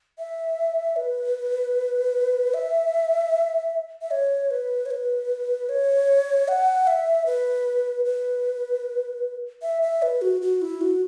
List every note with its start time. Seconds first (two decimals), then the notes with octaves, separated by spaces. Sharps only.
0.18 E5
0.96 B4
2.54 E5
4.02 E5
4.12 C#5
4.51 B4
4.86 C#5
4.91 B4
5.69 C#5
6.48 F#5
6.87 E5
7.26 B4
8.05 B4
9.62 E5
9.82 E5
10.02 B4
10.22 F#4
10.42 F#4
10.62 E4
10.81 F#4